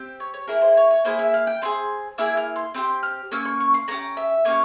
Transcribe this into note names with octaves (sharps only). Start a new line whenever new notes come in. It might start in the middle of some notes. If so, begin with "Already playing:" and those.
Already playing: C4 G4
C#5
C#5
A#3 E4 G#4 A#4
C5
C#5
C#5
A#3 E4 G#4 C5
E5
F5
G5
C4 E4 G#4 C6
A#3 E4 G#4 E6
F6
C6
C4 G4 C6
F6
A#3 C#4 E6
C#6
C#6
C6
A#3 C#4 G4 A#5
E5
A#3 C#4 G4 C#5